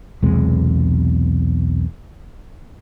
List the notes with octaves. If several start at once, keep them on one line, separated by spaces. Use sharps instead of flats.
B1 E2 C3 G#3